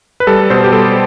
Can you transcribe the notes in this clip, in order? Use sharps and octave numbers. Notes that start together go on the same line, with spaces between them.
B4
G3 A4
B2 C5
G4
G3 A4